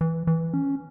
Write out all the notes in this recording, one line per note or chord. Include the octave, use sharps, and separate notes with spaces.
E3
E3
C#4